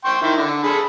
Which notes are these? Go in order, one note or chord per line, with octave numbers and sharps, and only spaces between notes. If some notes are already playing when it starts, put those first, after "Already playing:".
G5 C6 C#6
D#3 E4
D3
G#4 A4 B5